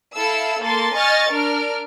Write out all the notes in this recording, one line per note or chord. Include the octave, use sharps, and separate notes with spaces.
E4 A4 F5 E6
A#3 A4 C6 A6
D#5 G#5 C#6 F6 A6 A#6
D4 A#4 F6 D7